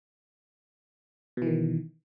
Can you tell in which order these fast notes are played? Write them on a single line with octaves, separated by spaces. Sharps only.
B2 E3 D#3